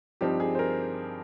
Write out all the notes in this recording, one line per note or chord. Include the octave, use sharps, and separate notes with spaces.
G2 F3 C4 D#4 G4
G#4
C5
A#4